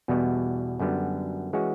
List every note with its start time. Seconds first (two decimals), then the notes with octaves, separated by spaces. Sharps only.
0.08 E2 B2 G3 B3
0.80 F#2 D3 G3 B3
1.53 E3 G#3 C#4 F#4